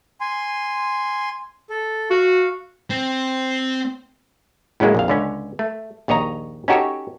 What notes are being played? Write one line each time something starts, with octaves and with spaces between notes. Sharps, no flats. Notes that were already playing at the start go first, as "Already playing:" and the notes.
G#5 C6
A4
F#4 F5
C4
A2 C#3 F#3 G#3 A#3
A#1 F2 F5
C#2 D3 C#4
A3
A#1 D#2 C#5 D#5 A#5
C#4 D#4 F#4 G4 A4 C#5